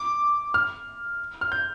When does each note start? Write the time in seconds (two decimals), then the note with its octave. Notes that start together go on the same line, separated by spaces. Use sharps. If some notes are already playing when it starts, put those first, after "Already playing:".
Already playing: D6
0.54 F6
1.41 F6
1.52 G6